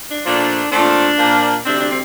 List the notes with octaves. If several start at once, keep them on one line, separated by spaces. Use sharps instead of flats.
D4
A#2 F3 A3 D4
A#2 F3 A3 C4 D4
A#2 F3 A#3
D2 C3 G3 C4 D4
D4
C4